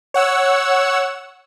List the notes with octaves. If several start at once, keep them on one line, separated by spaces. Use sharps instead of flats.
C#5 F#5 E6